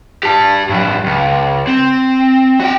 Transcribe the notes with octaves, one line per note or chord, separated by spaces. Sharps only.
G4 A5
G2 F#3
C#2
C4
F#4 G5